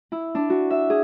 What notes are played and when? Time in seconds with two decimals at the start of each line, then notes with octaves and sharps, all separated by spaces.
0.12 E4
0.35 D4
0.50 F#4
0.70 E5
0.90 G#4